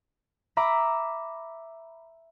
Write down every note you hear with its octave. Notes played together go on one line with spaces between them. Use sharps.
E5 A#5 B5 D6 E6